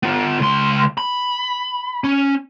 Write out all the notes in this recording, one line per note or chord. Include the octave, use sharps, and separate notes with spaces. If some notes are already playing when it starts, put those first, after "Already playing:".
B3 F4
C#2 C6
B5
C#4